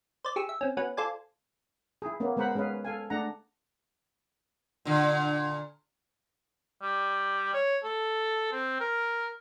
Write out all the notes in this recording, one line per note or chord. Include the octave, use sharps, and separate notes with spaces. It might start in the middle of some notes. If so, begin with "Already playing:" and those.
C5 D5
G4 G#4 C#6 E6
E5
C4 C#4
B3 C#4 F#4 B4
F4 A4 C5 D5 G#5
E4 G#4
A#3 B3 C#4
G#3 B3 A#4 C5 F#5 B5
G#3 C#4 G#4 B4 F5
A4 F5 G#5
A3 D4 G#4 F#5 A#5
A#2 D3
G3
C#5
A4
C4
A#4